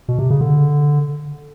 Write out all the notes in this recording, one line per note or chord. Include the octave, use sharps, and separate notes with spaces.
B2
C3
C#3
D3